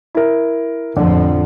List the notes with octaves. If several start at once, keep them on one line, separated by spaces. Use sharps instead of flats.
E4 A#4
A1 F2 D3 F3